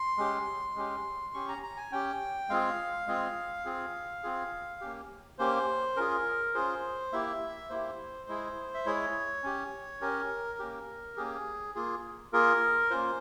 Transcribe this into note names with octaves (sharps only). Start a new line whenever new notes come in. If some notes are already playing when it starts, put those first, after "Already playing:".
Already playing: C6
G#3 C#4 G4
G#3 C#4 G4
C#4 G4 C#6
A#5
A#5
G#5
C#4 G4 G5
G#3 C4 F4 G#4 F5
G#3 C4 F4 G#4
C4 F4 G#4
C4 F4 G#4
A#3 C#4 G4
A#3 C#4 G4 C5
C#4 F4 G#4 A#4
C#4 F4 G#4 C5
A#3 E4 G4 E5
A#3 E4 G4 C5
G#3 E4 G#4
E5
G#3 E4 G#4 C#5
C#4 G4
C#4 G4 A#4
A#3 C#4 G4
A#3 C#4 G4 G#4
A#3 F4 G#4
A#3 F4 G#4 A#4
A#3 C#4 F4 C5